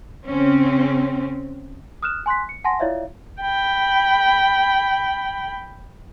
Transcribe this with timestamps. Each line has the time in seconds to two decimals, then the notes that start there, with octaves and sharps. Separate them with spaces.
0.25 C#3 C4 C#4
2.02 D#6 F6 F#6 E7
2.26 G#5 C6 F#6 B6
2.49 C#7
2.64 F#5 G#5 A5 C6 A#6
2.80 E4 F4 C#5 D5 E5 F5
3.41 G5 B5